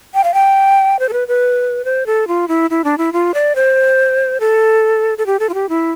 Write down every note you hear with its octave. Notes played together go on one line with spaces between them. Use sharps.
G5
F5
G5
C5
A4
B4
B4
C5
A4
F4
E4
E4
D4
E4
F4
D5
C5
A4
A4
G4
A4
F4
G4
E4